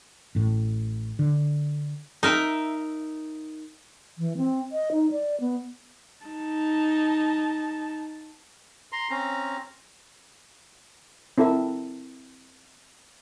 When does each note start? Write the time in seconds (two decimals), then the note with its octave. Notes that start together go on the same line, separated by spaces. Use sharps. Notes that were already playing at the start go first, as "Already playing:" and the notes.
0.35 A1 A2
1.19 D3
2.23 D#4 A#4 E5
4.18 E3
4.37 C4
4.72 D#5
4.92 D#4
5.11 D5
5.40 B3
6.26 D#4 A5
8.92 A#5 C6
9.10 C4 C#4 A#5
11.38 C4 E4 A4 A#4 E5